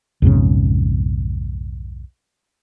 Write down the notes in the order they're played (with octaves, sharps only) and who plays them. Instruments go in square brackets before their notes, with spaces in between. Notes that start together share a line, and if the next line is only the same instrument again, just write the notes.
[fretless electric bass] B1 F2 G#2 C#3